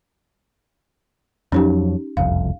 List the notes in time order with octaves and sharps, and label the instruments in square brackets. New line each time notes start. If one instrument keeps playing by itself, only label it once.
[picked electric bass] F2 F3 F#3 [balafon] C#4 D#4 G4
[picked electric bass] F#1 C2 F2 [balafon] F5